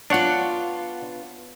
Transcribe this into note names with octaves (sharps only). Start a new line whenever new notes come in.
B3 D4 F4 C#5 F#5